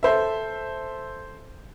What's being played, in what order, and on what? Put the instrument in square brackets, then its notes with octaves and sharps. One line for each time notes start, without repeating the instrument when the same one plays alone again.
[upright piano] A4 C5 E5